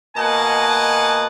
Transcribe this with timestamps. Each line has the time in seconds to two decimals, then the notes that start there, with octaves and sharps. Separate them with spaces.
0.17 B2 A#3 D#5 F#5 G#5 A5